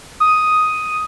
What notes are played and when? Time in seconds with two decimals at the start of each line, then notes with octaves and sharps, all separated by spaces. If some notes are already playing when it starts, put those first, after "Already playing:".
0.20 D#6